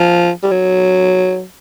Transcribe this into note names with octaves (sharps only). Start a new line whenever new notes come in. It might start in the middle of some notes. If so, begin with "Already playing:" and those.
Already playing: F3
G3
F#3